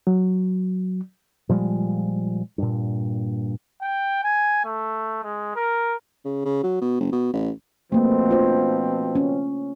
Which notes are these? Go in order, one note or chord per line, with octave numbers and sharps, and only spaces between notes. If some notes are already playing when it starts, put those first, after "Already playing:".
F#3
A#2 F3 G3 G#3
G2 A#2
G5
G#5
A3
G#3
A#4
C#3
C#3
F#3
B2
F#1
B2
A1
B2 F3 A3 A#3 C4
D4 F4 C5
C#4